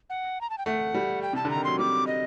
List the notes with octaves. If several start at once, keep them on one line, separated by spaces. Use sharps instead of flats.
F#5
A#5
A5
G5
A3 F#5
G3
G5
C3 A5
D3
A#5
D#3
F#3 C6
G3 D6
D#5